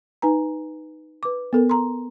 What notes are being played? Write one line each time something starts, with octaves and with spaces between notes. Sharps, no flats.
D#4 B4 G#5 A#5
B4 D6
B3 A4 A#4
A#5 C6